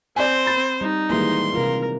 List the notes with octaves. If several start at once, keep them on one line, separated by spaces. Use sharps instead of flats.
C4 C5 D5 G#5
B5 A6
G3 D#4
A#2 D#3 E3 G3 G#3 A#3 C6
C3 F4 A#4